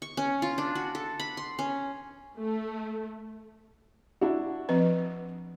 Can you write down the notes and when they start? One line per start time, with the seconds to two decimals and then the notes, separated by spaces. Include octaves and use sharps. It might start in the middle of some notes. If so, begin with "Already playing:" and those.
0.02 C#6
0.17 C#4
0.42 F4
0.58 D4
0.75 F#4
0.95 A4
1.20 B5
1.37 C6
1.59 C#4
2.38 A3
4.21 D4 E4 F#4
4.69 F3 C4 B4